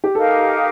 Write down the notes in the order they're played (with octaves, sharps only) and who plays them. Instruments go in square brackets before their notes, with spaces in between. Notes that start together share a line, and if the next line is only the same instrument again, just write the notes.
[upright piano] G4
[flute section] D#4 G4 A#4 F5 [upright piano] A4